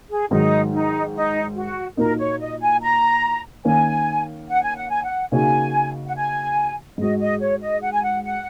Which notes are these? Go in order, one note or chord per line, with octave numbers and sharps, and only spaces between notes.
G#4
G#2 D#3 F#3 D#4
D#4
D#4
F#4
A#2 A#3 D#4 F#4 A#4
C#5
D#5
G#5
A#5
D#3 A#3 C#4 G#5
F#5
G#5
F#5
G#5
F#5
C#3 A#3 D#4 F#4 G#5
F#5
G#5
G#2 G#3 F#4 D#5
D#5
C#5
D#5
F#5
G#5
F#5
F#5